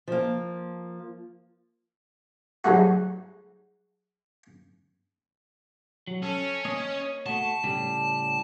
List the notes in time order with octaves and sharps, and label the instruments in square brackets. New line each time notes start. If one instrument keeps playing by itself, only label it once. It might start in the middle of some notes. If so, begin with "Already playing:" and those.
[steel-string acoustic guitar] F3 A#3
[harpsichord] G#2 F#3 G3 A3 F#4
[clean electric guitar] F#3
[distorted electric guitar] C#4 [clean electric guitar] A4
[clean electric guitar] A#3 C#5 D#5
[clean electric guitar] A3 F#4 [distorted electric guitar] A5
[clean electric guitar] A2 C#3 G3